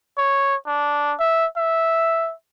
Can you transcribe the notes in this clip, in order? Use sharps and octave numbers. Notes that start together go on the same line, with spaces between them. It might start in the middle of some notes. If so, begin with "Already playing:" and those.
C#5
D4
E5
E5